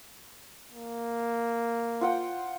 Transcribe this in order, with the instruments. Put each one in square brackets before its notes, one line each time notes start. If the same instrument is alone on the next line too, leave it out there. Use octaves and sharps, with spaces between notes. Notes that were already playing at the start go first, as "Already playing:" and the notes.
[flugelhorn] A#3
[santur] F4 F#5 G5